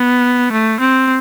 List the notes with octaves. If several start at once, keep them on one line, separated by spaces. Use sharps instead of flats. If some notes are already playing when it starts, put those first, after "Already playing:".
Already playing: B3
A3
C4